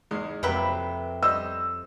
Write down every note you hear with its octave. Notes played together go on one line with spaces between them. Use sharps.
E2 G#2 G#3
F2 C3 F#3 A#3 B4 E5 G5
G3 C5 D#5 E6